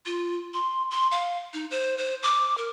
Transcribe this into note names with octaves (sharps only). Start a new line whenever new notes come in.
F4
C6
C6
F5
D#4
C5
C5
D6
A#4